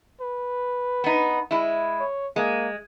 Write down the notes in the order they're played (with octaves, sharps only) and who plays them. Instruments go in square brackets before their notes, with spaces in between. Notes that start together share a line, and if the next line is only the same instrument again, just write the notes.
[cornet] B4
[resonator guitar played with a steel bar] B3 D#4
G#3 E4
[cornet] C#5
[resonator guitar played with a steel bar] G#3 [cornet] A#3